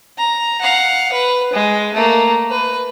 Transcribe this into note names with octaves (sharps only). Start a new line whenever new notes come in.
A#5
F5 F#5
B4
G#3
A3 A#3
B4